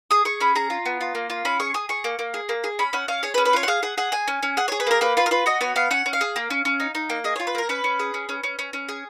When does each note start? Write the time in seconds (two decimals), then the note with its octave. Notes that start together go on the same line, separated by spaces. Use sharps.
0.11 G#4 D#6
0.25 G#4 C#6
0.40 C#4 B5
0.55 G#4 A#5
0.70 F4
0.85 B3
1.01 F4
1.15 A#3
1.30 F4
1.45 C#4 B5
1.60 G#4 C#6
1.74 G#4 D#6
1.89 G#4 C#6
2.04 A#3
2.19 A#3
2.34 G#4
2.49 A#3
2.64 G#4
2.79 C#4 B5
2.93 C#4 F#5
3.08 C#4 F5
3.23 G#4 C#5
3.34 B4
3.38 C#4
3.45 B4
3.53 F4 C#5
3.63 F#5
3.68 G#4 F5
3.83 G#4 F#5
3.98 G#4 F#5
4.12 G#4 G#5
4.28 C#4
4.43 C#4
4.57 G#4 F#5
4.68 G#4 C#5
4.80 B4
4.87 A#3 A#4
5.01 A#3 B4
5.17 F4 B4
5.26 A#4
5.31 F4 B4
5.46 F#4 D#5
5.61 B3 C#5
5.76 B3 F5
5.91 C#4 F#5
6.06 C#4
6.13 F5
6.21 G#4
6.36 A#3
6.50 C#4
6.65 C#4
6.80 D#4
6.95 D#4
7.10 A#3
7.24 G#4 D#5
7.36 F4 C#5
7.47 B4
7.55 A#3 A#4
7.69 C#4 B4
7.84 C#4
7.99 G#4
8.14 C#4
8.29 C#4
8.43 C#4
8.59 C#4
8.73 C#4
8.89 G#4